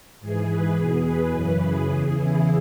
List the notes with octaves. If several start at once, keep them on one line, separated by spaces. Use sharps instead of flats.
G#2 E3 G#4
B4
E2 B2 G#4
B4
F#2 C#3 E3
G#4
E2 C#3 E3
E4